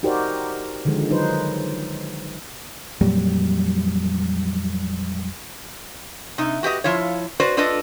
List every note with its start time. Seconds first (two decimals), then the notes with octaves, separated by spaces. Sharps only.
0.03 D#4 F#4 G4 A#4 C5 D5
0.85 D3 D#3 F3 G#3
1.10 F#3 D#4 B4 C5
3.01 F2 A#2 F#3 G3
6.38 C3 D#4
6.63 F#4 G4 B4 D#5
6.84 F3 E4 F4 C#5
7.40 F#4 B4 C5 D5
7.57 D4 F4 A4 B4 D#5